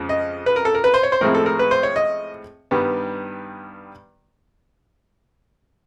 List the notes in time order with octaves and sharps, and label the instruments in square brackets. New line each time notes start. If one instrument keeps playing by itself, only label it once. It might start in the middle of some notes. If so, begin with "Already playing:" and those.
Already playing: [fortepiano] F2 C#3 F3 G#3
D#5
B4
A#4
A4
A#4
B4
C5
C#5
C5
A2 F3 G#3 C4 E4 A#4
A4
A#4
B4
C5
C#5
D#5
G2 D#3 G3 B3